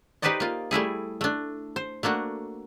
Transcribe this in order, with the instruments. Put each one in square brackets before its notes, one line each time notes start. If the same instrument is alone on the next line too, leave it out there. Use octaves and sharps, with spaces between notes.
[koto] D#4 G4 B4 C5 D5 D#5
A#3 F4
G3 A3 E4 G#4
A3 D4
C5
A3 A#3 D4 F#4